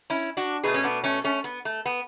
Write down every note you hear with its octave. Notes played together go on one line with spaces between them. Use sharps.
C#4 E4
D4 F#4
B2 A3 G#4 B4
C#4
B3 D4
A3 C#4
A3 C#4
B3
A3
B3